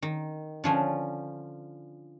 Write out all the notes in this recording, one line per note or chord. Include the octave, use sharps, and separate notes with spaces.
D#3
D3 F3 C#4